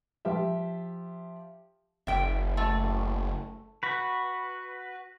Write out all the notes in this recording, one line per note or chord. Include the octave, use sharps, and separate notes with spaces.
F3 G4 E5
F#1 E5 G5
A3
F#4 B4